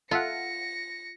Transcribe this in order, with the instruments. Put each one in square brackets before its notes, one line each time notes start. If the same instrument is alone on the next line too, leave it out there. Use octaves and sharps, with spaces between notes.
[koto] F4 [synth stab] A4 E5 F#5 [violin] A#6 C#7